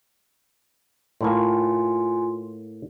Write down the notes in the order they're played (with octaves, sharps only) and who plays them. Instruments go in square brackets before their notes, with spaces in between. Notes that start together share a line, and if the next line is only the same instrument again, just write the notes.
[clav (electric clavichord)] A2 A#3 [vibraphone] F4 G#5 C6